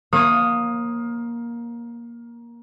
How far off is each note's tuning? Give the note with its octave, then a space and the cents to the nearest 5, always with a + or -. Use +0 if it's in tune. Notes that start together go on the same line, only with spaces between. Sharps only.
A#3 +15 C#5 -35 D#6 +0